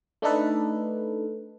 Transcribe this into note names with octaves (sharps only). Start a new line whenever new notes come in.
A3 D4 D#4 A4 B4